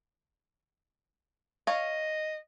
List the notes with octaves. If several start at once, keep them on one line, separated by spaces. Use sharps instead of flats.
C#5 D#5 F5